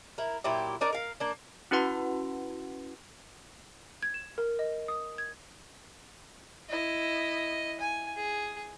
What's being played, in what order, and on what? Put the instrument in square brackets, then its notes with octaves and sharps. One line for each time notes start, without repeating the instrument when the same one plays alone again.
[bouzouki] E4 A#4
A#2 F#3 E4 G4
D4 D#4 A#4 D5
A#4 F5
A#3 D4
[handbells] C#4 E4 F#4 B4 F#5 C6
[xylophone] G#6
E7
A#4
D#5
D#6
G#6
[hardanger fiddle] E4 D#5
G#5
G#4